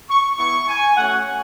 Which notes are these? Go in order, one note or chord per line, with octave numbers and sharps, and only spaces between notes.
C#6
B3 E4 C#6
G#5
A3 C#4 F#4 F#5